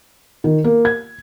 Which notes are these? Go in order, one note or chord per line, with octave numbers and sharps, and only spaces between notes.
D#3
A#3
G#6